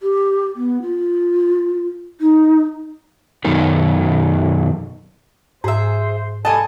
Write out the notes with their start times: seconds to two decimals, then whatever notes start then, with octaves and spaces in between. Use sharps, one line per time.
0.03 G4
0.56 B3
0.82 F4
2.21 D#4
3.45 F#2 B2 D#3
5.64 G#2 G#4 C5 E5
6.45 G3 A4 D#5 G#5 A5